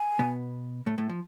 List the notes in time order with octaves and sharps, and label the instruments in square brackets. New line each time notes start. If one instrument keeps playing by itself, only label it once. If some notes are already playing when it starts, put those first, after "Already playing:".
Already playing: [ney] G#5
[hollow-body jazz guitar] B2 B3
A2 A3
A2 A3
F3